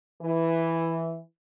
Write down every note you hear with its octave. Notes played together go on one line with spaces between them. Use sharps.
E3